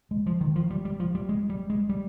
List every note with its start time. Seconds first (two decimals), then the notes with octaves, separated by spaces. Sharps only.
0.11 G#3
0.26 F3
0.41 D#3
0.56 F3
0.70 G3
0.85 G3
1.00 F3
1.15 G3
1.29 G#3
1.50 G3
1.70 G#3
1.89 G3